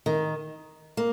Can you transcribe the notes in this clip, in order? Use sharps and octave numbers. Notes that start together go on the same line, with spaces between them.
D#3
A#3